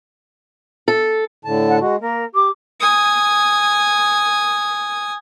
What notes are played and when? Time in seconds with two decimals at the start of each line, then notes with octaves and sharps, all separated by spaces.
0.88 A4
1.45 A2 D3 A5
1.69 F#5
1.81 G#3 F#4
2.01 A#3 A#4
2.35 G4 D6
2.80 G#5 D#6